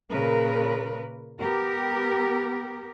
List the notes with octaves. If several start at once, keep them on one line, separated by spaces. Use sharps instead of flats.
A#2 C#3 A#4 B4
B3 G4 A#4